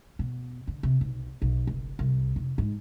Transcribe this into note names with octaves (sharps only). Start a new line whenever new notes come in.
B2
D3
C3
B1
B1
F#1
C2
F1
G#2